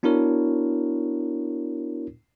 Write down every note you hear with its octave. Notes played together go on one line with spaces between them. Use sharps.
B3 D4 E4 F#4 A#4 C#5